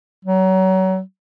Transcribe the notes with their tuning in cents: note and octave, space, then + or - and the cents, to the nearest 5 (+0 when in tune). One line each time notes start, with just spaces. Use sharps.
F#3 +30